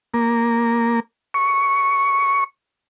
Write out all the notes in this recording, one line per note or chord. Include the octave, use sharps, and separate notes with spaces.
A#3
C#6